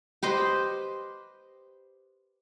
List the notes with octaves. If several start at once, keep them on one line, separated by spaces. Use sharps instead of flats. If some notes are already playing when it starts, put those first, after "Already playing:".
G4 B4 C5 D#5